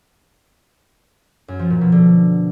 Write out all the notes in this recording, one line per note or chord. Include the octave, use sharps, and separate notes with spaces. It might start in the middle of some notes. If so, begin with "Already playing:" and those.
F#2
F3
A#2
B2
D3